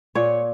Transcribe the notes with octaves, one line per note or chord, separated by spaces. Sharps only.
A#2 C#5